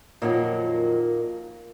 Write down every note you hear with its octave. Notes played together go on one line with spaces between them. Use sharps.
F2 A#2 D#3 F#3 A#3